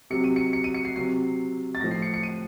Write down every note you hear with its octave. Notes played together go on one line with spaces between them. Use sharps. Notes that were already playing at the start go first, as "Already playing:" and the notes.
C3 F#3 C#7
D#7
C#7
C#7
D#7
C#7
C7
C3 F#3 C7
A6
A2 F3 A#6
C7
C#7
C#7
D#7